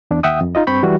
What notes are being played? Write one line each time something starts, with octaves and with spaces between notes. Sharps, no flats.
E2 D4
D#2 E5 F#5 G5 D#6
F2
D#4 F4 D#5
G2 C4 B5 C#6 G6
E3 G3 F#4